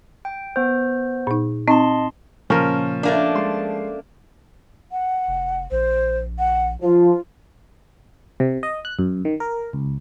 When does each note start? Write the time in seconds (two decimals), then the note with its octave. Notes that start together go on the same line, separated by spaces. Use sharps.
0.25 G5
0.56 B3 C5
1.27 A#2 D#4
1.68 C4 D#4 D#5 A5 C6
2.50 A#2 C#3 F3 C#4 A#4
3.03 A3 A#3 D4
3.35 G#3 C6
4.92 F#5
5.27 F1
5.71 A#1 C5
6.39 F#5
6.82 F3 F4
8.40 C3
8.63 D#5
8.85 F#6
8.99 F#2
9.25 D#3
9.40 A#4
9.73 C#2